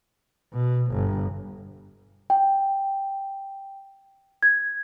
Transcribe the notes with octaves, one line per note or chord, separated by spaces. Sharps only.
B2
G1
G5
G#6